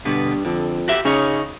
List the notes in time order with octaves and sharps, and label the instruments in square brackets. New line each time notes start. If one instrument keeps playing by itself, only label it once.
[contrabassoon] G2 [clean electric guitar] B2 D3 B3
[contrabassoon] F2 [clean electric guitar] D3
[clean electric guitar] F#4 G4 E5
[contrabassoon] C#3 [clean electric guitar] C#4 D#4 C#5